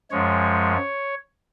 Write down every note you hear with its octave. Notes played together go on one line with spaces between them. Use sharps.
F#2 F3 G#3 C#5